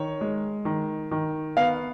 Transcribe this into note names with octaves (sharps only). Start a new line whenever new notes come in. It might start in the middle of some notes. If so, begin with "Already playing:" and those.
Already playing: D#3 C#5
G#3
D#3
D#3
B3 F5